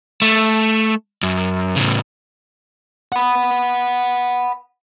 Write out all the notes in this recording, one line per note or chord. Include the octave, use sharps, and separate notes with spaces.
A3
F#2
A2 C#3
F#5 B5